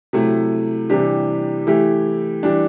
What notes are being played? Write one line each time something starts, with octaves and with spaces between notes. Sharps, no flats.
C3 F#3 A3 E4
C3 E3 G3 D4 G4
E3 A3 E4 G4
E3 G3 D4